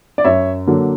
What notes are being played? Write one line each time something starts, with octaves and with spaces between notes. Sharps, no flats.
D5
F#2 C#5 E5
D3 F#3 A#3